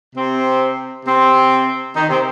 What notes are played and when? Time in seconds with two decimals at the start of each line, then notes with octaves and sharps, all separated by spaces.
0.15 C3 C4
1.05 C3 C4
1.95 D#3 D#4
2.09 C3 C4